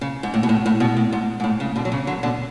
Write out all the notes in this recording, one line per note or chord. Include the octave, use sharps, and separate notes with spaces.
C#3
G#2
A2
B2
A2
A2
B2
A2
G#2
G#2
A2
C#3
B2 D3
F#3
C#3 E3
D3 F#3
B2 D3